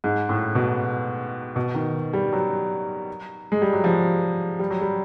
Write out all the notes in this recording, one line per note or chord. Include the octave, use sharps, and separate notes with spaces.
G#2
A2
B2
B2
D#3
G3
F#3
G#3
G3
F#3
F3
G3
F#3
G3